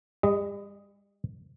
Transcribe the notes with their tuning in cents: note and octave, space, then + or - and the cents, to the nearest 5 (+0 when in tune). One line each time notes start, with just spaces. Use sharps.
G3 +40 D#5 +0